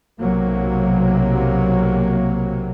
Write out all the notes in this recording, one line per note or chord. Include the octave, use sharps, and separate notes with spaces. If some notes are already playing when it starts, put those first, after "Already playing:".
B1 C3 F#3 A#3